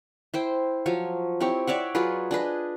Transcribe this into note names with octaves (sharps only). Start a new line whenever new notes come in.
E4 C5 G5
F3 F#3 C#5
C4 E4 G4 C#5
C#5 D5 E5 F#5
F#3 F4 G#4 B4
D4 G#4 B4 D#5